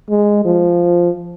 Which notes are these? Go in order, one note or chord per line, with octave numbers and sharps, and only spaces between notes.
G#3
F3